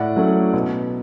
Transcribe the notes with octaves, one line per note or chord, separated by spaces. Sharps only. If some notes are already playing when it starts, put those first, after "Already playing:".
Already playing: A2 D5 F#5
F#3 A3 C#4
B2